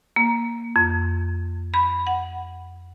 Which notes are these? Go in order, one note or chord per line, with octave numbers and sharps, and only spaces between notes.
A#3
F2
B5
F#5